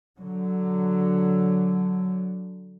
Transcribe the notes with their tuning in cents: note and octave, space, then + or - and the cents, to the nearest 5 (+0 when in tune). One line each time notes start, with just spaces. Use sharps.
D3 +0 F#3 +0